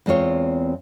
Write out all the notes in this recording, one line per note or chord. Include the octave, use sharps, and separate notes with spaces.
E2 G#3 C4 F4 C#5